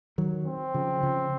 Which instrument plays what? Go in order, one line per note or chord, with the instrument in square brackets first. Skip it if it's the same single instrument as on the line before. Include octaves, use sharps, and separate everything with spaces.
[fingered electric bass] D#3 F#3
[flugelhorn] C4
[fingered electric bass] C#3 F3
C#3 F3